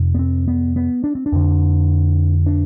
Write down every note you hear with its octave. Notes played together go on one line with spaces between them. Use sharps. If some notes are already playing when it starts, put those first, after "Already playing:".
Already playing: F2 C3
B3
C4
B3
B3
D4
C4
D4
F2 D3
D4